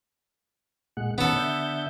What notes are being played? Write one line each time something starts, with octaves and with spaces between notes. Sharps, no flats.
A#2 G#3 F#5
B2 D#3 B3 C#4 A4
D3 E5 G6